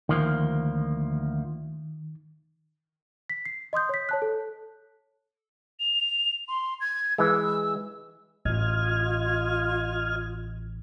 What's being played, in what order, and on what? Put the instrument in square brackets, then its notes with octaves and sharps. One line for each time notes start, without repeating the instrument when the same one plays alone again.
[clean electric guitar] D2 F3 A#3 [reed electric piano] D#3
[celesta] B6
C7
D#5 C6 D#6 G6
C#5 B6
C#5 A5 F#6
A4
[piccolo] F7
C6
G#6
[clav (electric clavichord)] E3 G#3 [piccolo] E6
[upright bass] A1 [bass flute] F4 [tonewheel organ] D#5 F6 G#6